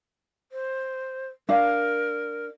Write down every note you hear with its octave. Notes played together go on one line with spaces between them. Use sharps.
C5
D4 A#4 F5